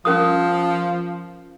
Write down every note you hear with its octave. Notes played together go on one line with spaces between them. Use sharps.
F3 C#4 A#4 D#6